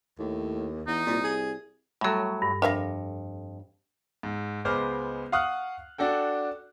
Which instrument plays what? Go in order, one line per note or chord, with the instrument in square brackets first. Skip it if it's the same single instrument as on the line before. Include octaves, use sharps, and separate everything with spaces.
[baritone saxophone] D#2 [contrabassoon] A2
[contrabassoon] E2 [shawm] D#4
[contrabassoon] C2 [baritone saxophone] A#2
[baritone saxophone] G#4
[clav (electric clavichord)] A2 F#3 [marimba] G3 A4
[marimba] G2
[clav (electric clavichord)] F2 [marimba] D4 A#6 [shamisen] A#4 E5 F5
[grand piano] G#2
C#2 G#3 B3 C5 D6 F6
F5 F#5 C#6 D#6 F6 F#6
D4 F#4 A4 G5